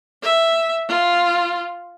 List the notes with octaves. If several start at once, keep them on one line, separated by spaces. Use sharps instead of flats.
E5
F4